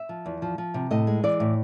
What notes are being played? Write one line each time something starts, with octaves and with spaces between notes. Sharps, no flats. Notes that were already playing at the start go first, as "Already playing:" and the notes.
Already playing: E5
F3
E2
F3
F3
C3
A2 D#5
G#3
E3 D5
A2